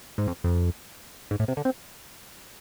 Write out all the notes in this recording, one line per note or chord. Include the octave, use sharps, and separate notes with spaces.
G#2
F2
F2
G#2
A2
C3
D3
C4